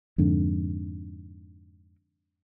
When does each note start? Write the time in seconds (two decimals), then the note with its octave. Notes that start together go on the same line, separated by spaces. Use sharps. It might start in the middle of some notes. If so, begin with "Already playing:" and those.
0.18 F2 G#2 D3